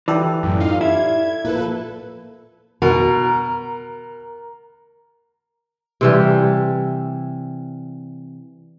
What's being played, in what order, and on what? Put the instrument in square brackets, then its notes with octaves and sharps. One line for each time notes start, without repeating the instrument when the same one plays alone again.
[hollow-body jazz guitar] E3 [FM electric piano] G4 A4 D5
[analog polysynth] F#2 A2
D#4 F4 F5
[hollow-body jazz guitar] E4 [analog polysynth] G#6
[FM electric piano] A#2 F3 A#3 [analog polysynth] A4 B4
[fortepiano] B2 [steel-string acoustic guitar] A#4
[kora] C3 E3 G3